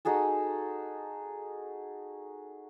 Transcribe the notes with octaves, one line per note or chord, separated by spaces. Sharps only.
D#4 F#4 G#4 A4